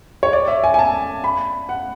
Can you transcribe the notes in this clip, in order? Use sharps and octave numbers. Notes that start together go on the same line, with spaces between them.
C#5
D5
E5
G#5
G#5
A5
B5
F#5